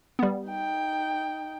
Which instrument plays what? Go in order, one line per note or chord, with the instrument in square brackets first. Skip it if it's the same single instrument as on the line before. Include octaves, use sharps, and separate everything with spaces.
[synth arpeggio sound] G3 B3
[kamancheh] D#4 G5